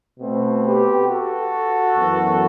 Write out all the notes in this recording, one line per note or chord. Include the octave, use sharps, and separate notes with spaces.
B2 A3 C4
G4 B4
F#4 A4
F#2 E3 B3